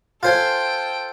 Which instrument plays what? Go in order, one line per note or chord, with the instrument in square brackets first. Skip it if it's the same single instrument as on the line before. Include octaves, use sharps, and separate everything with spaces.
[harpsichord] F4 C5 G#5 [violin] A4 G5